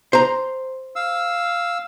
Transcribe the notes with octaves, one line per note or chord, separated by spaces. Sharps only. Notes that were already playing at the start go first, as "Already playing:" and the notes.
C5 A#5
F5 E6